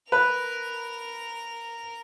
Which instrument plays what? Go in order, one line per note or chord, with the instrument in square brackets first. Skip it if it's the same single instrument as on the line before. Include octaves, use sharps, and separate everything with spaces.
[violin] A#4 F7 [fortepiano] B4